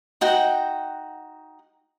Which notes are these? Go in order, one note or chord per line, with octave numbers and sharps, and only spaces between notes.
D#4 F#4 F#5 G5